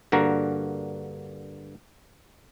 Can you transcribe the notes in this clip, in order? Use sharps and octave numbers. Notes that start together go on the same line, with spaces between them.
G2 D3 A#3 F#4 A#5